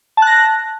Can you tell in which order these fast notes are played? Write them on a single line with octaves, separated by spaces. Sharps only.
A5 F#6 A#6